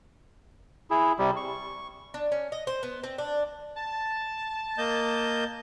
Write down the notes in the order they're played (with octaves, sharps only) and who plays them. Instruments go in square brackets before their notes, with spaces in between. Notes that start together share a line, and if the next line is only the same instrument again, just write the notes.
[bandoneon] E4 G#4
C3 G3
C#6
[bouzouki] D4
C#4
D#5
C5
B3
C4
D4
[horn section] A5
[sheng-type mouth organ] A#3 D#5 G6